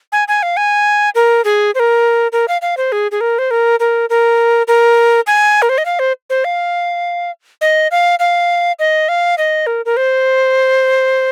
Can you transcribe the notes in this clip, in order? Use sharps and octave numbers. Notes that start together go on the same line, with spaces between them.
G#5
G#5
F5
G#5
A#4
G#4
C5
A#4
A#4
F5
F5
C5
G#4
G#4
A#4
C5
A#4
A#4
A#4
A#4
G#5
A#4
C5
D#5
F5
C5
C5
F5
D#5
F5
F5
D#5
F5
D#5
A#4
A#4
C5